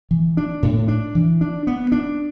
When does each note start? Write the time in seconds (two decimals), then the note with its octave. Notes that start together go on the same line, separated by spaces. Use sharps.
0.11 E3
0.37 D4
0.63 A2
0.88 D4
1.15 E3
1.41 D4
1.67 B3
1.92 D4